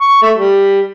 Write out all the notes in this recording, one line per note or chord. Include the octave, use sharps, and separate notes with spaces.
C#6
A3
G3